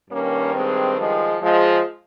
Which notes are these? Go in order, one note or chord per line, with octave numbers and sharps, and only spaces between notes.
G2 D#3 A#3 C#4
G#3 C4
F3 G#3
F3 G#3